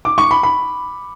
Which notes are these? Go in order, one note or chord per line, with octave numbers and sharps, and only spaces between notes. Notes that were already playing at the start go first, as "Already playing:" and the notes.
D6
C#6
B5
B5